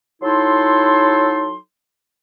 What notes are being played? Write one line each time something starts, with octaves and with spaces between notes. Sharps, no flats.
F#3 D#4 E4 A4 C6